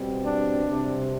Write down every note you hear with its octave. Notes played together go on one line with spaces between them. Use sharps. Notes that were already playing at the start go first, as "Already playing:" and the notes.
Already playing: B2 G3 C4
D4
C3 G3 C4